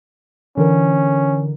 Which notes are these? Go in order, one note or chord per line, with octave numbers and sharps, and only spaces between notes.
D3 E3 C#4 A#4